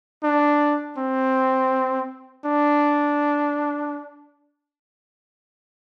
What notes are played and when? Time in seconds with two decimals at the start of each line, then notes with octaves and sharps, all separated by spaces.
0.23 D4
0.98 C4
2.45 D4